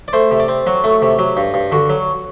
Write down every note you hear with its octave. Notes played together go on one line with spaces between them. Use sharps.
D5
A3 C5
C3
D5
C4
F#3 F#4
A3
C3
F#3
G2
G2
D3 F#4
F#3